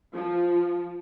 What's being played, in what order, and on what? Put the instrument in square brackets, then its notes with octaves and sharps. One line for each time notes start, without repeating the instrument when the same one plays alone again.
[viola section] F3